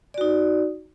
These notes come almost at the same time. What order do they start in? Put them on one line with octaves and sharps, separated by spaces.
D5 F#4 D#4